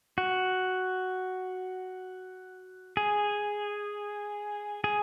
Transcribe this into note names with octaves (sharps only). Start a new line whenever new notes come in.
F#4
G#4
G#4